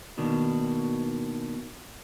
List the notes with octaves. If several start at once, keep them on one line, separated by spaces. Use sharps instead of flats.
D#2 B2 D#3 D4